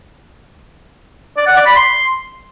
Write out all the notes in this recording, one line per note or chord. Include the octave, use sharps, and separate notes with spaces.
D5
F#5
D5
B5
C6